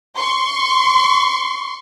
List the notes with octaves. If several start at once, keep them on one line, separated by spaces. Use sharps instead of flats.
C6 C#6